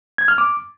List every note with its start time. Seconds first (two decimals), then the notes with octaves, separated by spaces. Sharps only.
0.18 G#6
0.28 F6
0.38 D6